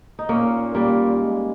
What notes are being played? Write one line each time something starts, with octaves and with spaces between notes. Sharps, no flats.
D#4
A#2 A#3 C#4
G3 A#3
G#3